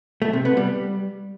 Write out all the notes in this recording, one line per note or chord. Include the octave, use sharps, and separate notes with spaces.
A3
C3
B3
G3